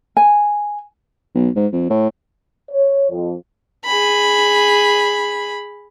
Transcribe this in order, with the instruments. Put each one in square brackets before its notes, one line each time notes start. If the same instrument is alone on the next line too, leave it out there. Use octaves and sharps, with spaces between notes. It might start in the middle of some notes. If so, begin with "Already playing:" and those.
[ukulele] G#5
[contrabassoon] B1
G#2
F2
A2
[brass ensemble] C#5
F2
[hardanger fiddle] G#4 B5